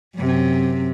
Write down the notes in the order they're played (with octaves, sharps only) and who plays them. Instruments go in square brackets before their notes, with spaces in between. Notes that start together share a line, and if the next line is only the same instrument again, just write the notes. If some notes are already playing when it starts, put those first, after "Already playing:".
[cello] F#2 C3